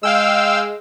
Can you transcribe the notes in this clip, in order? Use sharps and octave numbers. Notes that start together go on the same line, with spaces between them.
G#3 F5 G5 E6